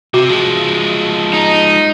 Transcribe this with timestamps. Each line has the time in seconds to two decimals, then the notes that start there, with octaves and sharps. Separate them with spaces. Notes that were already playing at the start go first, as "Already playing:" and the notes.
0.14 C3 F#4
0.29 F3 G#3
1.33 D#4